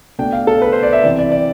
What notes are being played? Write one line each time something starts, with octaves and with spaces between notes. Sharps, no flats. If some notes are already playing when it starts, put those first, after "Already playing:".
B2 A3 D4 G5
F5
A4
B4
C5
D5
E5
C3 E3 G3 D5
D5
D5